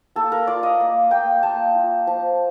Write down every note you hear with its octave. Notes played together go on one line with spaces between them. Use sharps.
A#3 A4
A#4
F4 D5
D#5
A#3
A#3 G5
A#3 A5
F4
F3 A5